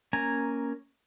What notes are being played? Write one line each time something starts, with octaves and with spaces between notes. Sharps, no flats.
A#3 C#4 G#5 A#5